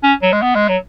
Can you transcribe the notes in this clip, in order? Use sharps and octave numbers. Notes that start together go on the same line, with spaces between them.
C#4
F#3
G#3
B3
G#3
F#3